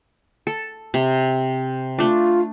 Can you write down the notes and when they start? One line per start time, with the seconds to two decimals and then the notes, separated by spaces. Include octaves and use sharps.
0.47 A4
0.94 C3
1.99 A3 D4 F4